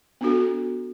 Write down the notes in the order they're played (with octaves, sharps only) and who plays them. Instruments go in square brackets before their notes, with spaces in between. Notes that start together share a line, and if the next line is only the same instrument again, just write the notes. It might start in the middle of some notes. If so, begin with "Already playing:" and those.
[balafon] B3 D4 F#4 A4